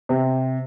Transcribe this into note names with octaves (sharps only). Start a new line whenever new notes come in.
C3